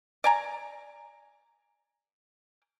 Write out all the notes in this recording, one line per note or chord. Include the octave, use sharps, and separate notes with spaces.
D5 G#5 A#5